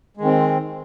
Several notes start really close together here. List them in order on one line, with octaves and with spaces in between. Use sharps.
G#3 D#3 C4